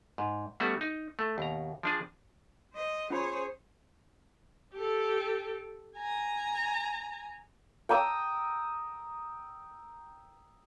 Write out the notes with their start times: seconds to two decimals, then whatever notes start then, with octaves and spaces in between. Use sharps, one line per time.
0.18 G#2
0.60 G3 A3 B3 C#4 F#4
0.81 D#4
1.19 A3
1.38 D#2 B2 A#5
1.83 F3 D4 G#4
2.74 C5 D#5
3.10 C#4 F4 G#4 C5 C#5 B5
4.74 G4 A4
5.97 G#5 A#5
7.89 G5 A#5 D#6 E6